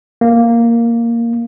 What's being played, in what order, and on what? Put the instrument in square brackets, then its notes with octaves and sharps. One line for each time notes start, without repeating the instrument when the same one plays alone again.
[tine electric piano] A#3